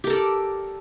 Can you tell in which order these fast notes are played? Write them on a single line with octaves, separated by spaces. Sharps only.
G4 A#4 A4 D5